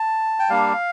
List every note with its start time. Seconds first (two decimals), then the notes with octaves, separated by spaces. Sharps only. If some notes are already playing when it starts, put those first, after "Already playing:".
Already playing: A5
0.39 G5
0.49 G3 A#3 D4 F5